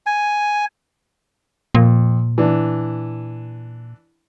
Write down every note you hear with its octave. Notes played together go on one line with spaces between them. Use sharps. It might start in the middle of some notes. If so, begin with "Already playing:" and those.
G#5
F2 A#2
E3 D4